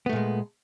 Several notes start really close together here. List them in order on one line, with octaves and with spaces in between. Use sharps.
B3 A3 A#2 G#3